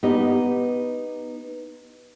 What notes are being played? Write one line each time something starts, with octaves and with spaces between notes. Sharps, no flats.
B3 D#4 G4 D#5